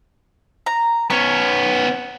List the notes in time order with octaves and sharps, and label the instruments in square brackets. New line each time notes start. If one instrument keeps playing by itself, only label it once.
[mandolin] A#5
[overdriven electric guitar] B3 C#4 [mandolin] C#6